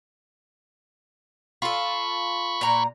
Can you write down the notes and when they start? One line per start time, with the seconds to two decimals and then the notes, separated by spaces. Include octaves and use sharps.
1.62 F4 A4 B5 C#6
2.61 A#2 A#5